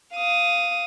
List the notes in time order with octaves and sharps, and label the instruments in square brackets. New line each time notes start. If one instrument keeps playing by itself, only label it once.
[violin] F5 D#6